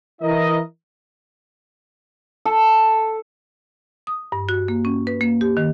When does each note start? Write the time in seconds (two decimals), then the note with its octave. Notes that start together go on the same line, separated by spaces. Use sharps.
0.22 E3 E4 A#4 D#5
2.46 A4
4.07 D#6
4.32 G2
4.49 F#4
4.68 A#3
4.85 C#4
5.07 B4
5.21 A#3
5.41 G4
5.57 D#3